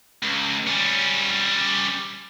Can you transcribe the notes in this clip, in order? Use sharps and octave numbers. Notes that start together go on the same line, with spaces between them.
C#2
G3 C#4